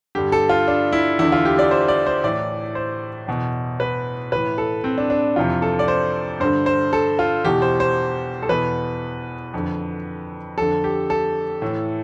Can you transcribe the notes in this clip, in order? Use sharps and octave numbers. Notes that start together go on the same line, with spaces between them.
G2 D3 G4
A4
F4
D4
E4
E2 D3 E4
F4
G4
D5
C5
D5
C5
A2 E3 D5
C5
E2 B2
B4
A2 E3 B4
A4
C4
D4
D4
F2 C3 E3 F4
A4
D5
C5
G2 D3 C5
C5
A4
F4
E2 B2 G4
C5
C5
A4
E2 B2 B4
F2 D3
F2 D3 A4
G4
A4
A2 E3